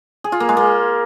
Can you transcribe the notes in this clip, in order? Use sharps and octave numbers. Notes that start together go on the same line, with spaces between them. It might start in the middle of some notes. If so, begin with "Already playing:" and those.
G#4
F4
A#3
G#3
A#3